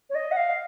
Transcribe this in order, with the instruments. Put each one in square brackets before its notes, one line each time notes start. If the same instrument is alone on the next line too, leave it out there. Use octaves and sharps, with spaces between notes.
[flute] C#5
D#5
F#5
F5